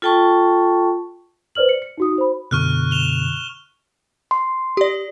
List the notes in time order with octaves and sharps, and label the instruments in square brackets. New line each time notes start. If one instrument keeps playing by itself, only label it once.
[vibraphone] F4 A4 G5 A5 C#6
[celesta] B4 C5 D5 F6 F#7
C#7
C#7
D#4 F#4 D#6
C5 B5
[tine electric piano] F#2 B2 D3 [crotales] C#6 F6 F#6
[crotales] E7 F7 G7
[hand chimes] C6
[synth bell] G4 D5